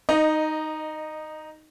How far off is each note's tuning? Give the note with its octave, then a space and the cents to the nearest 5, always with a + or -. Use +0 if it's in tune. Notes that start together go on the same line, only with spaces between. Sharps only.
D#4 +0 D#5 -15